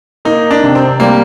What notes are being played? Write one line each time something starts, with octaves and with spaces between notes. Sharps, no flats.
A#3 D#4
D4
C3
C4
G3 A#3